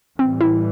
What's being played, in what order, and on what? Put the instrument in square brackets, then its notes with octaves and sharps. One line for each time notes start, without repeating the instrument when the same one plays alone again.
[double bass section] A2 E3 G3 [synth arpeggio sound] C4
[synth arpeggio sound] E4